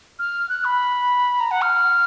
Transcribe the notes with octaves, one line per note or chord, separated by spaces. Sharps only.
F6
F#6
B5
A#5
F#5
F6